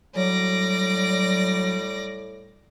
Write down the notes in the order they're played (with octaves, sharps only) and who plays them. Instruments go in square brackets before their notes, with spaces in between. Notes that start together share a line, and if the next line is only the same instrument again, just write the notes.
[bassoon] A2 [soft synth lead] F#3 [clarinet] G3 [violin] D5 A#6